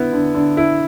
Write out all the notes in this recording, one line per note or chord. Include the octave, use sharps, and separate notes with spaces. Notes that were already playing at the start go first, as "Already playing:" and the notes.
Already playing: D3 B3 E4
D3
D3
E4